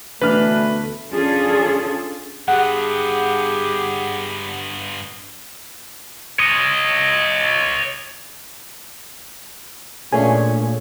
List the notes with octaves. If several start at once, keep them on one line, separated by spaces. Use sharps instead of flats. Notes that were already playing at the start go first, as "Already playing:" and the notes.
D2 B2 E3 A3 D4 B4 F6
C#4 D4 F4 G#4 A4
G2 B3 G4 G#4 F#5
C#5 D#5
A#2 A3 C#4 D4 G#4 G#5